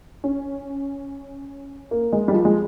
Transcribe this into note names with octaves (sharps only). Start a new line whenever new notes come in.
C#4
A#3
G#3
G3
F3
G#3